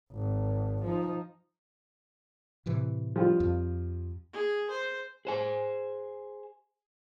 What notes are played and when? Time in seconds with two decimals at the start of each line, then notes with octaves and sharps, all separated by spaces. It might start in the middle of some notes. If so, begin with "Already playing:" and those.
0.12 G#1
0.84 F3 D#4
2.66 A2 C3 E3
3.16 F3 G3 F4
3.40 F2
4.33 G#4
4.70 C5
5.25 G#4 C5 G#5